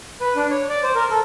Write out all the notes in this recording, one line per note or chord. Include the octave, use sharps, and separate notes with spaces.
B4
D4
C#5
D5
C5
A#4
A4